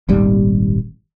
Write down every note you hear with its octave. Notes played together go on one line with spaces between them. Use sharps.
D#1 G#1 D#2 G3